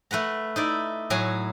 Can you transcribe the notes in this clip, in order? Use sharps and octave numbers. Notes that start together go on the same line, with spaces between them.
A3 B4 F#5 A#5
D#4 E4 D5
A2 F#3 F#4 G#5